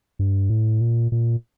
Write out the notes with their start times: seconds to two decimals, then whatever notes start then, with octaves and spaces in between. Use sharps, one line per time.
0.19 G2
0.50 A2
0.81 A#2
1.12 A#2